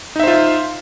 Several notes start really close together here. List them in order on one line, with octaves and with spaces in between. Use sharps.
D#4 E5 C5 F4